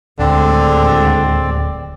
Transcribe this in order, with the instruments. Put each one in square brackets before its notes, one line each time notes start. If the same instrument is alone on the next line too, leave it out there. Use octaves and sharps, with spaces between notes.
[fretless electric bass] D1 [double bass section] D#2 A2 G#3 [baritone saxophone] D3 [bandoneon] C4 D5